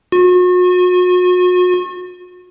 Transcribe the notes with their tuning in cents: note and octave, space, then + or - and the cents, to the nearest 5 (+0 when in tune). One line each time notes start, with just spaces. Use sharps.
F#4 -40